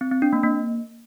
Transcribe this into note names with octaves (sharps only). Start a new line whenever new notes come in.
C4
C4
D4
A#3
A#3